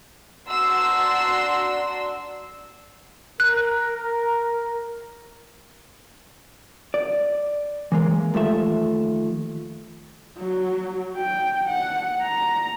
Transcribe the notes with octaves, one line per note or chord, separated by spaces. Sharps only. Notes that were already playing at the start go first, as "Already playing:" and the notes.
D4 F#4 A#5 C6 E6
A#4 F#6
D5
E3 G#3 A#3
D#2 F3 A3 E5
F#3
G5
F#5
A#5